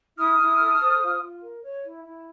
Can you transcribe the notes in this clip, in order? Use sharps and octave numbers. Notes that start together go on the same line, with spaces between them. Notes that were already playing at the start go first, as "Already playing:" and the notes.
E4 D#6 F6
E4
A4
C5
F4
F4
A#4
C#5
E4
E4